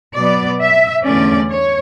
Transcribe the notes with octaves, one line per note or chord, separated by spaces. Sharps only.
B2 F#3 B3 D5
E5
E2 D3 A3 C#4 D5
C#5